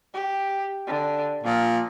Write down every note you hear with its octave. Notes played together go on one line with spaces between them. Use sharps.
G4
D3
A#2 F3